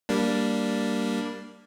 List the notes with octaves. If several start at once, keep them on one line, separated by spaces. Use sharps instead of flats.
G3 A#3 D4